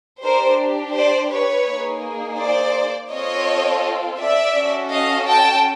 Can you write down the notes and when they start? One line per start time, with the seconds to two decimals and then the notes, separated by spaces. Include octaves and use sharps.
0.22 D4 G4 A#4 C5
0.94 C5 D5
1.31 B4 C#5
1.66 A#3 D#4 G#4
2.39 C5 D5
3.10 C4 F4 A4 C#5 D#5
4.19 D5 E5
4.55 C#4 F#4 A4
4.91 D#5 F5
5.28 G5 A5